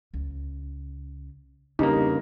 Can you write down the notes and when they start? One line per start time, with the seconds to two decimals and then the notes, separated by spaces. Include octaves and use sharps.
0.14 C#2
1.79 E2 G2 C#3 A#3 D#4